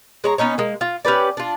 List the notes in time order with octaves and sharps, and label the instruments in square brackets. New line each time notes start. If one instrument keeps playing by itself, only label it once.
[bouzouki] G#3 C#5 A#5
B3 C#4 D#4 C#5
G#3 A#3
F4
C#4 G4 B4 D5
D4 F4